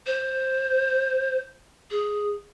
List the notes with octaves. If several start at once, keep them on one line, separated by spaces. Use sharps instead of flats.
C5
G#4